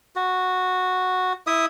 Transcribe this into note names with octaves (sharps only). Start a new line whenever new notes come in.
F#4
E4 E5 D#6